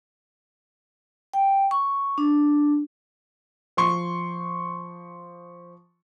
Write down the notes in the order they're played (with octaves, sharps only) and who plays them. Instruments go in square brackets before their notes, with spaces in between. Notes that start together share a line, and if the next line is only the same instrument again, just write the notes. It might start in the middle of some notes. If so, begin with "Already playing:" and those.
[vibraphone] G5
C#6
D4
[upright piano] F3 C6 C#6